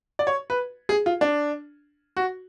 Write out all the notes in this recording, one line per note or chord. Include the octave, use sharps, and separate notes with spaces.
D5
C#5
B4
G#4
F4
D4
F#4